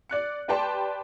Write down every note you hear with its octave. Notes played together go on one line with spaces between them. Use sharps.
D5 F#6 C#7
G4 B4 D5 G5 A5 C6